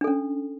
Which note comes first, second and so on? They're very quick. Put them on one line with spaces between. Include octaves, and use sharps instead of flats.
D4 A4 C#4